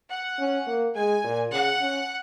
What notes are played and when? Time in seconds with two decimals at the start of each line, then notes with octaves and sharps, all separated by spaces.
0.10 F#5
0.39 C#4
0.67 A#3
0.96 G#3 G#5
1.24 A#2
1.52 C#3 F#5
1.81 C#4